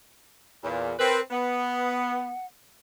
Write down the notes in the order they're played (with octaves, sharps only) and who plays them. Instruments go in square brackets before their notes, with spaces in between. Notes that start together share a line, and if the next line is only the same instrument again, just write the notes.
[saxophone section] E2 A#2
[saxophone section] C4 B4 [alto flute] A#4
[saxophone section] B3 [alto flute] F#5